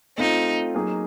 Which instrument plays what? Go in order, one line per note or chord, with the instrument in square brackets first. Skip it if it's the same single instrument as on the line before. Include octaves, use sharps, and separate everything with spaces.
[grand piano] A3 C4 F4 [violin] D#4
[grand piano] F#3 A#3 D#4 G#4